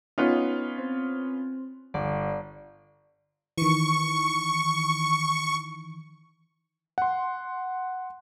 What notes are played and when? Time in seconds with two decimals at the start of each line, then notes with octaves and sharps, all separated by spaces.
0.18 B3 C#4 D#4 F4
0.78 C4
1.94 G1 D5
3.58 D#3 E3 C#6
6.98 F#5 C6